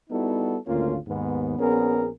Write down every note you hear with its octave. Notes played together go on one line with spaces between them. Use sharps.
G3 B3 D#4 E4 F#4 A4
G#1 D2 A#3 C#4 F4
D#2 G#2 B3
A#1 B3 C#4 G#4 A#4